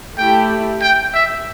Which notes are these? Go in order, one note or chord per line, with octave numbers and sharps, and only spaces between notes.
A3 E4 G4 G5
G5
E5